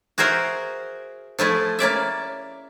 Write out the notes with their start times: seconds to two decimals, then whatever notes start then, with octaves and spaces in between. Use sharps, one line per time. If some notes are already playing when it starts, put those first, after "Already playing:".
0.18 F#4 G#4 A#4 C5 E5
1.39 F3 A3 E4 G#4
1.79 A#3 C#4 D5 E5